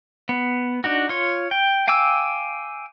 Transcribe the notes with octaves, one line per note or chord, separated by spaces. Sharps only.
B3
D4 D#4 F#4
F4 C#5
G5
F5 G5 G#5 D6 E6